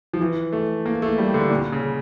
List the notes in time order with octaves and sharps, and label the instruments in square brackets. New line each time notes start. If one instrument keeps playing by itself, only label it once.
[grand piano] F3
E3
A3
A#3
A3
G3
D3
A#2
C#3